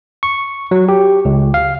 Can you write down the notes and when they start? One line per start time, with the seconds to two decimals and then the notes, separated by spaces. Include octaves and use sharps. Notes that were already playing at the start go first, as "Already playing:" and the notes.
0.23 C#6
0.71 F#3
0.89 G4
1.25 C#2
1.54 F5